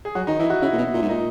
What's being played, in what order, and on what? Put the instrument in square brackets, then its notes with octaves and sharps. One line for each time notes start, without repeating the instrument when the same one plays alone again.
[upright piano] G#4
[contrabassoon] F#3 [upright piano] F#4
[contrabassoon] D#3 [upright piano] D#4
[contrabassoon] E3 [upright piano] E4
[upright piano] F#4
[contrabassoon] C#3 [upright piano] E4
[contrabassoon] A#2
B2
A#2
G#2
[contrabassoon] A#2 [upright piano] D#4